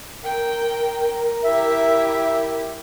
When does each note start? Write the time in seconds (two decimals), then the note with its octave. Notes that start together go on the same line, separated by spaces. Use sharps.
0.24 A#4 G5
1.44 E4 G4 E5